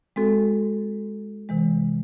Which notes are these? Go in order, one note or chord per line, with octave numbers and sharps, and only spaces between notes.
G#3 C4 F#4 A4
C3 E3 G#3